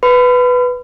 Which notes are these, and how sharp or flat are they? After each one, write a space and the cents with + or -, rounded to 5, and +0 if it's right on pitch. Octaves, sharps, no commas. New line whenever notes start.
B4 +0 B5 +35